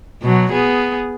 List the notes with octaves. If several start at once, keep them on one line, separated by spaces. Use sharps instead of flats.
B2 F#3
B3 G#4